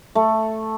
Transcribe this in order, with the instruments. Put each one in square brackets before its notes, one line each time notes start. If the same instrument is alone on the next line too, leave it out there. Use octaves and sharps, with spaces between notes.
[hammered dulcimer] A3